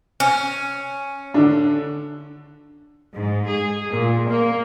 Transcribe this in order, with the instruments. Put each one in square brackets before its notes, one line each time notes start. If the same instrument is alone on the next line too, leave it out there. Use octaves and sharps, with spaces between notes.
[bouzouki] C#4
[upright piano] D3 D4
[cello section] G#2
G#4
A#2
A#3